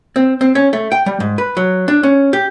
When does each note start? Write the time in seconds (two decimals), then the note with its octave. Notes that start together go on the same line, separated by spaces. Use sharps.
0.16 C4
0.41 C4
0.55 C#4
0.73 A3
0.92 G5
1.06 G3
1.20 G#2
1.38 B4
1.57 F#3
1.88 D4
2.03 C#4
2.33 G4